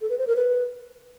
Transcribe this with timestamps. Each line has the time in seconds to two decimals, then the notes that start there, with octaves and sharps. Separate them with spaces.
0.01 A4
0.09 B4
0.18 C5
0.27 A#4
0.36 B4